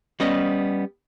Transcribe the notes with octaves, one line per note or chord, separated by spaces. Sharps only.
G3 B3 C#4 D#5